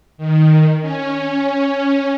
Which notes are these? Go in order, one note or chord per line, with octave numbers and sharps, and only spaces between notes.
D#3
C#4